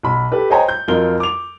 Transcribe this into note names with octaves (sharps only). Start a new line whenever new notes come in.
B1 B5
G4 A4 B4
C5 C#5 D#5 G5 G#5 A#5
G6
F2 F#3 F4 A#4 D#5 G7
D6 F7